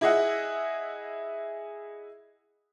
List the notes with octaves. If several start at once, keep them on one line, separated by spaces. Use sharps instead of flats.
E4 G#4 D#5 E5 F#5